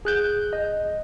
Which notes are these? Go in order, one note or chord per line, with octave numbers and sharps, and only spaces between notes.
G#4 F#6 G6
D#5